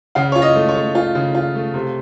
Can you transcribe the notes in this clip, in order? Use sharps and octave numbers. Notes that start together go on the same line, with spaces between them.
C#3 F5
F4 C#5
D#5
A3
C#5
A3
F4
C#3
F4
A3
C3